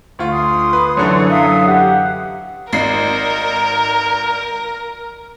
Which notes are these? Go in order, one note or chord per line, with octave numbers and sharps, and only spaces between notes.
D2 F4
C6 D#6
B4
F#2 D3 E3 C#5
F#3 E5 F5 D#6
G4 F#5
G#1 D#4 A#4 C7